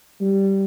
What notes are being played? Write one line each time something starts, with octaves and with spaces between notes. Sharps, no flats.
G3